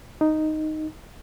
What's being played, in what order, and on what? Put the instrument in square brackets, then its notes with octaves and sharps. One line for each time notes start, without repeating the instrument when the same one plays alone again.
[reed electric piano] D#4